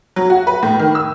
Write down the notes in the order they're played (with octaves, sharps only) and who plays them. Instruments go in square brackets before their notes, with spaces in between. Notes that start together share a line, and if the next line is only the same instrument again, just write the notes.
[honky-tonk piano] F#3
F#4
B4
A2
D#3
E6